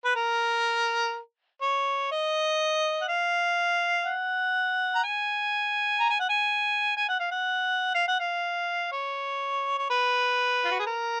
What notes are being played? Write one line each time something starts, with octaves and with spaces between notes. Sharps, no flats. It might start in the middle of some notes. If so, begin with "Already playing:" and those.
B4
A#4
C#5
D#5
F#5
F5
F#5
A#5
G#5
A#5
G#5
F#5
G#5
G#5
F#5
F5
F#5
F5
F#5
F5
C#5
C#5
B4
F4
F#4
G#4
A#4